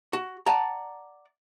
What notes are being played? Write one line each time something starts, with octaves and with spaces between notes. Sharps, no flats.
F#4
D5 F#5 A5 A#5